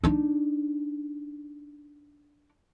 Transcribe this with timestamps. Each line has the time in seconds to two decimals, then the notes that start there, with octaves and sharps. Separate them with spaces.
0.04 D4 D#4